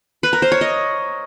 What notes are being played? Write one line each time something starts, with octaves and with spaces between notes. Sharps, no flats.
B4
A#4
C5
C#5
D#5